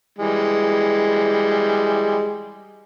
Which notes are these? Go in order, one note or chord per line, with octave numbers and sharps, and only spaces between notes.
E3 G3 G#3